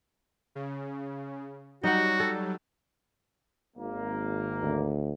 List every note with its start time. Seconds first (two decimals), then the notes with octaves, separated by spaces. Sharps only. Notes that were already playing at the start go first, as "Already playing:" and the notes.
0.55 C#3
1.84 F#3 G3 D#4 F#4 F#5
2.20 A4
3.77 G#1 A#3
4.63 D2